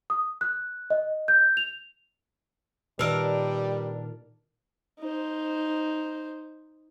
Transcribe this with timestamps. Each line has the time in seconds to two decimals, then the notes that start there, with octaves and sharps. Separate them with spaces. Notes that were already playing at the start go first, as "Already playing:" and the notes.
0.10 D#6
0.41 F#6
0.90 D#5
1.28 G6
1.57 F7
2.99 A#2 D#3 G3 D4 A#4 B4 E6 D7
4.99 D#4 C5